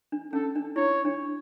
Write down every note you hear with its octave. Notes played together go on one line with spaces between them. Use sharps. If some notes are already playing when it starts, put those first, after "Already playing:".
D4
C#4 A4
D4
E4 C#5
D4